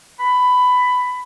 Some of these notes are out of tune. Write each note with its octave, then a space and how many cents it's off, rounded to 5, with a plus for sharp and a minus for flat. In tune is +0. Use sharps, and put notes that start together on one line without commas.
B5 +15